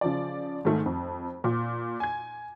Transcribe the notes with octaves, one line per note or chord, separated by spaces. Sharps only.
C#3 F3 D5
G#2 D#3 A3
F2
A#2
G#5 G#6